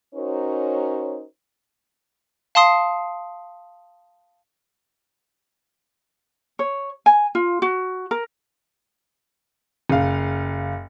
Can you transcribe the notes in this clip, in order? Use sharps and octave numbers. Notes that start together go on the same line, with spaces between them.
C#4 D#4 F#4 A#4 C5 C#5
F5 A5 C6 D#6 C7
C#5
G#5
F4
F#4
A#4
F#1 F5